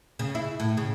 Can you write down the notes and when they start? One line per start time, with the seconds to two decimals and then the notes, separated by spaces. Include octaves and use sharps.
0.19 C#3
0.35 E4
0.60 A2
0.77 C#3